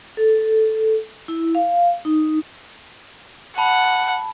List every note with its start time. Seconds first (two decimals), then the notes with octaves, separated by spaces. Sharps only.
0.17 A4
1.28 E4
1.55 F5
2.05 D#4
3.58 F#5 A5 B5